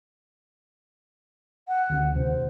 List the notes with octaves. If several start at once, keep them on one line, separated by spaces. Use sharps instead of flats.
F#5
D2 D3 C#4
D#2 C3 C5